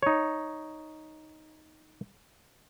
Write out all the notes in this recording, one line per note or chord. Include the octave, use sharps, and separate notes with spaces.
D#4 C#5